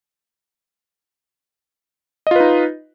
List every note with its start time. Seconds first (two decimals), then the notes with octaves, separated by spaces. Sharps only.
2.27 D#5
2.31 F4
2.36 B4
2.40 D#4